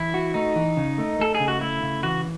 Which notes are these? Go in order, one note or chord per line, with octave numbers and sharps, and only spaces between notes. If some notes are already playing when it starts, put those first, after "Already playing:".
Already playing: E3 E4
F#4
A3 D#4
E3
C#3
A3
A3 A4
G#4
C#3
F#4
A3 E4
C#3
E3 F#4